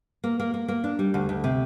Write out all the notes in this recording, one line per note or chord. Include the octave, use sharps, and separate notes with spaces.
A#3
A#3
A#3
A#3
D4
G3
D2
D2
C3